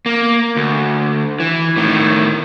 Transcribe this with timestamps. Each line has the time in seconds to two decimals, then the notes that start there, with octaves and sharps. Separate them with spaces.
0.06 A#3
0.56 D2
1.40 E3
1.77 A2 D#3